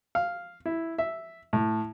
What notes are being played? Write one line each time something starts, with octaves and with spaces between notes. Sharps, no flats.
F5
E4
E5
A2